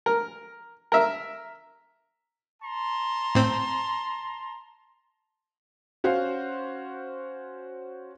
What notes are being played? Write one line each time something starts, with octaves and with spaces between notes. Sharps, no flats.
A#4
A#4 E5
A5 A#5 C6
A2 C4
C#4 F#4 C5 F5